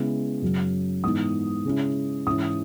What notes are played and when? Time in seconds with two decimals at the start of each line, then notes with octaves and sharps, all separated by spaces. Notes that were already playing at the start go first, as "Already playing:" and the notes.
Already playing: C#3 G#3 B3 E4
0.42 F#2 C#3 F#3
1.03 G#2 E3 B3 D#4 D#6
1.65 C#3 G#3 C#4 E4
2.26 G#2 E3 G#3 C#4 E4 D#6